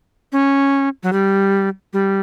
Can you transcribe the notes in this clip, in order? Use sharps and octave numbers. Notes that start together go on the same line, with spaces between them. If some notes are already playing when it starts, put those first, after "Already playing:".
C#4
F#3
G3
G3